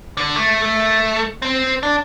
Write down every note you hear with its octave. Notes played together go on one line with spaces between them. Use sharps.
D3
A3
A3
C4
D4